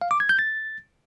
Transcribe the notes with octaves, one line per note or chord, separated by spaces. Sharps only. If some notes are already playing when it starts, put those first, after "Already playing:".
F5
D6
G#6
G6
A6